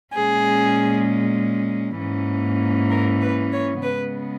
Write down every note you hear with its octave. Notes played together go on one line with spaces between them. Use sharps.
A#2 G#3 C#4 G#4
G#2 E3 A#3 C#4
A#4
B4
C#5
C#3 G#3 B3 B4